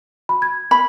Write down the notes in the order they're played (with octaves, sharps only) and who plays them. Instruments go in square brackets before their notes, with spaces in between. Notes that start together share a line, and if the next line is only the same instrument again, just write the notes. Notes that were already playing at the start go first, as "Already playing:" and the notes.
[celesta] B5
G#6
[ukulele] B5